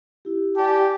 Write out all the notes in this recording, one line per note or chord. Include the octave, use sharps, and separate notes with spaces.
E4 G4
G4 D5 G#5 A5